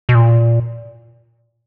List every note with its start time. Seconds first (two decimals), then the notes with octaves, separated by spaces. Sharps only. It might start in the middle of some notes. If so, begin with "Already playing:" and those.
0.09 B2
0.15 A#2